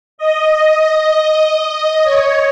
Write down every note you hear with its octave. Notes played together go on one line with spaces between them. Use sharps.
D#5
D#5
C#5